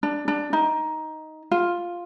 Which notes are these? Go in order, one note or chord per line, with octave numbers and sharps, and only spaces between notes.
D4
D4
D#4
F4